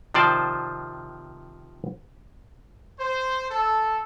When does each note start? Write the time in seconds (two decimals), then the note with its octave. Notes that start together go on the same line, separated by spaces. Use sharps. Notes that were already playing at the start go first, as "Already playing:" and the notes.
0.14 C3 D#3 F3 C5 D5 A5
2.99 C5
3.51 A4